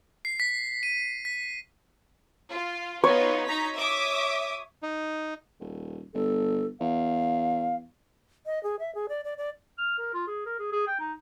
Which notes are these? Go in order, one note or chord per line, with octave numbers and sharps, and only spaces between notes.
C7
B6
D#7
B6
F4
B3 D#4 F4 C#5
D#4 A#5 B6
E5 D6 D#6
D#4
D#1
G1 A4
E2 F5
D#5
G#4
E5
G#4
D5
D5
D5
F6
A#4
F4
G#4
A#4
G#4
G#4
G5
D#4